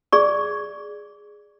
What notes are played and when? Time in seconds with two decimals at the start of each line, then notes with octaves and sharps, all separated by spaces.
0.12 G#4 D5 C#6